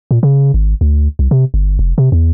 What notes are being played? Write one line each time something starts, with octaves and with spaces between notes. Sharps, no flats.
A#2
C#3
G#1
D2
C2
C3
G1
F1
C3
E2